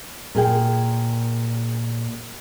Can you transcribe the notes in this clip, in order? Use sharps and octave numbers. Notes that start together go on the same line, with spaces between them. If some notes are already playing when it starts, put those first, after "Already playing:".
A#2 G#4 G5